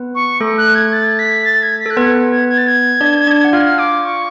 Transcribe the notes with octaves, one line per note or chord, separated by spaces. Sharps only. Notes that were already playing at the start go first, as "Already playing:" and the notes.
Already playing: B3 B4
C#6
A3 A4
F#6
G#6
A6
B6
A6
G#6
B6
A4 F#6
B3 B4 G#6
G#6
G#6
A6
G#6
D4 D5
D4 D5
F#5
F4 F5 F6
D6
C#6